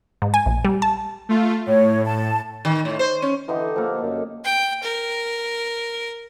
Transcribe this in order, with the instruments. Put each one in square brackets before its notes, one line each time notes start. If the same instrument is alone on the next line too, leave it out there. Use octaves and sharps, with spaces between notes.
[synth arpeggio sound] G#2
G#5
A#1
G3
A5
[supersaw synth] A3 F4
[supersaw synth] A2 [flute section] C#5
[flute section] A5
[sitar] D#3
A2
C5
C#4
[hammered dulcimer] D3 D#4 G4 [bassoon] E3
[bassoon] F3 [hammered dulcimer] A#3 A4
[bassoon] F#2
[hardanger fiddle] G5
A#4